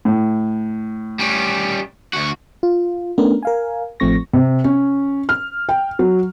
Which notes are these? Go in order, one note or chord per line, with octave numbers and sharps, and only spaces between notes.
A2
G3 C#4
D2 F#4
F4
A3 B3 C#4 D4 A#4
A#4 F5 G#5
A1 F3 A3 C4 C#6 A#6
C3
C#4
F6
G5
F#3